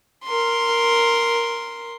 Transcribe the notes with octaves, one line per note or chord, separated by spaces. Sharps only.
A#4 C6